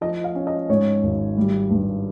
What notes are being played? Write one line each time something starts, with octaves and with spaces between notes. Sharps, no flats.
F3 D#5
F5
C#4
D#5
G#2 C#5
G#1
G3
G2